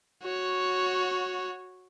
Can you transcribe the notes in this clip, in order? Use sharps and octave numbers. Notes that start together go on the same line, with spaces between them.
F#4 C#5